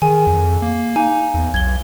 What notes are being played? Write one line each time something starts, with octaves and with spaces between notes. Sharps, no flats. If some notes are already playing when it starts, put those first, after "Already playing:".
D#3 G#4 G#5
F2
A#3
D#4 F5 G#5
E2
B1 G#6 G7